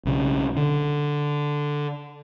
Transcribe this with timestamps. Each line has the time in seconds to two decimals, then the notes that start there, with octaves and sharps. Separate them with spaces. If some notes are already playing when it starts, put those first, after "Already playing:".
0.05 B1 C#3
0.56 D3